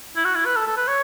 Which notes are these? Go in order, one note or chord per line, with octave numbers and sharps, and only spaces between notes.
E4
F#4
E4
B4
A4
A4
B4
C#5